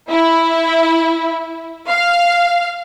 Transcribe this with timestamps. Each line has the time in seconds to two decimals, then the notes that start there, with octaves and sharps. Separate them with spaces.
0.10 E4
1.89 F5